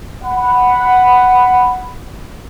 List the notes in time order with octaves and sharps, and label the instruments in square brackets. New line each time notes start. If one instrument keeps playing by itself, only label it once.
[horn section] F#5 B5